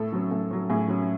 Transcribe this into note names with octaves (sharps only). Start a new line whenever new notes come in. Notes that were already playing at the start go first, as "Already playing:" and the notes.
Already playing: A2 A4
F#3 C#4
A2
F#3 C#4
A2 G#4
F#3 C#4